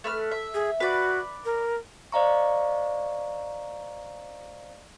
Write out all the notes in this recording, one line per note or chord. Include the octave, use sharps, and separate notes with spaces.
A3 B4 F6
E5
G#4
F#4 B4 D5
A#4
C5 D5 D#5 F5 A#5 C#6